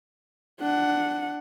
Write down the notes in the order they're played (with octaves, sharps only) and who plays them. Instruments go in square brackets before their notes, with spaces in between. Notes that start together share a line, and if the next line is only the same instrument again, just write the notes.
[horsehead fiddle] D4 F#5